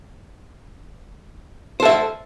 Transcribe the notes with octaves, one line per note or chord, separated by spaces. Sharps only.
A4 C5 E5